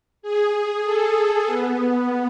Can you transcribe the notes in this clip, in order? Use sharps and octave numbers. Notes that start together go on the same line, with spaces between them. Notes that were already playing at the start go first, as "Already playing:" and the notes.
G#4
A4
B3